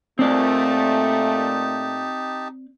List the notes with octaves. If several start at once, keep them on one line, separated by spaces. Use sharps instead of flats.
A#2 A3 C4 D#4 G4 D5 A5